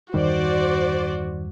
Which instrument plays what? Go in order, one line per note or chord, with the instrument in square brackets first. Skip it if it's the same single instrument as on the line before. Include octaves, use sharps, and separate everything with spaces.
[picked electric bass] E2 G2 G3 [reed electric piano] D#3 [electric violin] F#4 [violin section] C5 D5